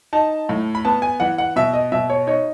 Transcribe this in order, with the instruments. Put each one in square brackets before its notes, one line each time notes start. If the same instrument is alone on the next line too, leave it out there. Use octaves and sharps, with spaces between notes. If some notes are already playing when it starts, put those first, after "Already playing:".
[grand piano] D#4 A5
A2
B5
B3 A5
G#5
E3 F#5
F#5
B2 E5
D#5
B2 E5
C#5
D#4 C#5